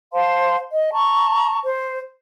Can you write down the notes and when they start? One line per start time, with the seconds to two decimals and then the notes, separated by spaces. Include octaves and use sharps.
0.13 C5 F5 A5 C6
0.74 D#5
0.93 A5 A#5 C#6
1.63 C5